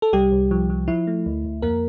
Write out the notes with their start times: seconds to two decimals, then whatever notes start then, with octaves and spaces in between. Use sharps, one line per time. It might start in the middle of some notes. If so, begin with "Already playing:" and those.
0.02 A4
0.13 C2 G3 G4
0.32 C2
0.51 F3
0.70 F3
0.88 F3 E4
1.07 A3
1.26 D2
1.45 D2
1.62 F2 A#3 A#4